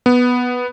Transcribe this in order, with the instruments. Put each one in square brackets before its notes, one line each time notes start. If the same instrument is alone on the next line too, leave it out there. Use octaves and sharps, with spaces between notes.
[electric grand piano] B3